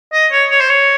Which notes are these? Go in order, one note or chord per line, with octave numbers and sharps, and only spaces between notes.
D#5
C#5
C#5
C5
C#5